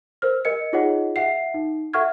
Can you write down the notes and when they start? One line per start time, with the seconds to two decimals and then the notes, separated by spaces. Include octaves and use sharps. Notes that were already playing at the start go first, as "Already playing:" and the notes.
0.22 A#4 C5 F6
0.45 A#4 D#5 C#7
0.73 D#4 F4 G#4 C#5 D#5 F#5
1.16 E5 F#5 C7
1.54 D#4
1.94 A4 E5 F#5 C#6 F6 G#6